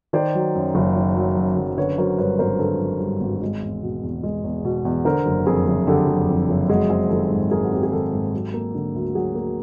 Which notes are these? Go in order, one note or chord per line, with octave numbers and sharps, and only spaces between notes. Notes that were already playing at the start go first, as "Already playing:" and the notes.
D#3 C5 D5
F#3
F#2
F#1
D#3
F#3
F#2
F#1
D3 B4 C#5
F#3 A#4 C5
G2 B4 C#5
G#1 A#4 C5
D3 A4 B4
F#3
G2
G#1
G#3
E2
B2
E2
G#3
E2
B2
E2
D3 A#4 C5
F#1
F2 G#4 A#4
F#1
D3 G4 A4
F#1
F2
F#1
G#3 F#4 G#4
C4
D#3 G4 A4
G#2
G#3 G#4 A#4
F#4
C4 G4
G#4
D#3 G4 A4
G#2
F#3
A#3
D3
D2
F#3 F#4 G#4
A#3